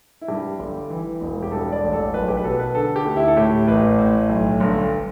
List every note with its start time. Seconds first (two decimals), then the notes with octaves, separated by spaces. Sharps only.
0.21 E4
0.28 G2 G4
0.59 G1
0.90 E3
1.21 E1
1.43 G4
1.52 G2 A4
1.72 D5
1.82 A1
1.93 A4
2.14 B1 B4
2.28 G4
2.37 B4
2.44 B2 A4
2.59 B4
2.74 D3 A4
2.96 G4
3.05 D2
3.16 E4
3.28 A4
3.37 A2 G4
3.68 A1 B4
3.99 A2
4.29 B1
4.60 G1